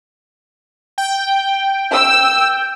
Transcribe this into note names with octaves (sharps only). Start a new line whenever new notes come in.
G5
E6